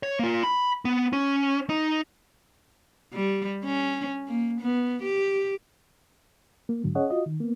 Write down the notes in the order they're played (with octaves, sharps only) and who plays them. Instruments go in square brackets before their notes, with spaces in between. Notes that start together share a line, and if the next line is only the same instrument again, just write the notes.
[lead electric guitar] C#5
A#3 F4
B5
B3
C#4
D#4
[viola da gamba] G3
C#4
A#3
B3
G4
[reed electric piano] A#3
G#2 D3 F#3
C#4 G#4 C#5 D#5 F#5
F4 F#4 D#5
D#3
A#3 B3